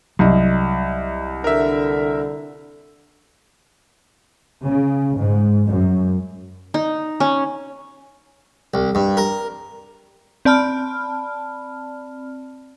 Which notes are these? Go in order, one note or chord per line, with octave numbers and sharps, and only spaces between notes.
C2 F#3 D#5
D3 A#4 E5
C#3
G#2
F#2
D#4
C#4
C2
G2
A#4
C4 D5 A5 B5 F6